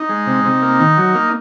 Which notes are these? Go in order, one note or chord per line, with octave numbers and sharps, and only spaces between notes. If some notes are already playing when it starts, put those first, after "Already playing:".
Already playing: D#4
G#3
C3
C3
A#3
D#3
F#3
A#3